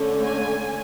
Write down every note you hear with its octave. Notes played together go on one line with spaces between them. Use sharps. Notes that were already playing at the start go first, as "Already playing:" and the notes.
Already playing: D3 A3 C#4
G#5